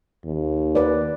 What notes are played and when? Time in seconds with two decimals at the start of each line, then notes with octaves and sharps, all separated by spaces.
0.25 D#2
0.75 B4 D5